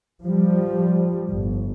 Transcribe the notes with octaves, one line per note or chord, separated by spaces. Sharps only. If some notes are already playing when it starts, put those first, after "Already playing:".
F3 G3
G1